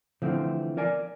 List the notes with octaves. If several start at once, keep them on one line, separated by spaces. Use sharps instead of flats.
D3 E3 F3 A3 C4
A#4 D5 G#5